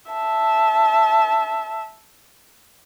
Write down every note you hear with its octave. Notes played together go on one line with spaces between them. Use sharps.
E5 A5